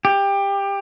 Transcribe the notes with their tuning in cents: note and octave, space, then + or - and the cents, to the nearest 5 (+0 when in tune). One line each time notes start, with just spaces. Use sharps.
G4 +20